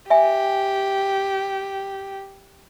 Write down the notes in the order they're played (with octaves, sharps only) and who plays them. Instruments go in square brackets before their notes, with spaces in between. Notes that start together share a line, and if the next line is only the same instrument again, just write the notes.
[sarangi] G4 [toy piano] E5 G#5